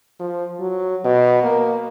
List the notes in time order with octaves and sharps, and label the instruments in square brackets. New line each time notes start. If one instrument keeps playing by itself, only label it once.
[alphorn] F3
F#3
B2
A#3